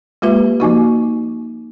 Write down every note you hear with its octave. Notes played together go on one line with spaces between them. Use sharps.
G#3 A#3 F4 G4 B4 E5
F3 A#3 D#4 F#4